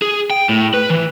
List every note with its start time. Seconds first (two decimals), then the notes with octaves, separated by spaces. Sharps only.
0.02 G#4
0.30 G5
0.49 A2
0.74 B4
0.90 E3